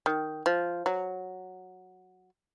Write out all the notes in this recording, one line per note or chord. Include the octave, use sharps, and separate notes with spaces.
D#3
F3
F#3